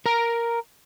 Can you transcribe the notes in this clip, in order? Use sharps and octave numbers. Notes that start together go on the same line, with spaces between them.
A#4 A#5